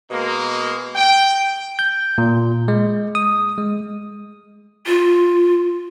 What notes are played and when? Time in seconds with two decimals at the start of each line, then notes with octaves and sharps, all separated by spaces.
0.11 B2 G#3 A#3
0.95 G5
1.79 G6
2.18 A#2
2.68 G#3
3.15 D#6
3.58 G#3
4.87 F4